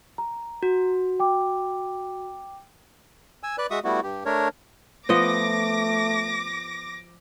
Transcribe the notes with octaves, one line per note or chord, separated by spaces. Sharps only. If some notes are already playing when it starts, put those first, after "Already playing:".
A#5
F#4
G5 D6
G#5 E6
B4 D5 F#6
G#3 F#4 E5 C#6 D#6
G3 A3 B3 E4 F#4
G2 G4
A3 D4 A#4 C#5
F3 A3 B3 D#5 D6 A#6